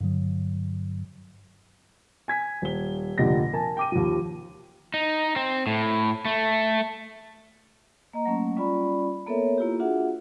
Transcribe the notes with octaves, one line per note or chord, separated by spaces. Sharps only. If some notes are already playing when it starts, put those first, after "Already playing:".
G2 D3 F#3
G#5 G#6 B6
D#1 G7
F1 A#2 D3 G4 D#5 A#6
A#4 G#5 A5
G5 D6 D#7
D#2 F3
D#4
C4
A2
A3
A#3 D#5 A#5
F#3 A3 A#3 C#4
G3 C#4 F4 D5 B5
A#3 B3 A4 A#4 C#5 E5
A#3 E4 F4 G4
D4 F4 F#4 G#4 E5 F#5